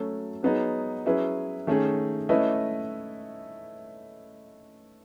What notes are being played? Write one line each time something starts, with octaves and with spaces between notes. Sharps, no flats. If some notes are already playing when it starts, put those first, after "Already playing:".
Already playing: F#3 A3 C#4 F#4 A4
F#3 B3 D#4 G#4
F#3 C#4 E4 G#4 B4
D#3 A3 C#4 G#4
A3 C#4 E4 B4 D#5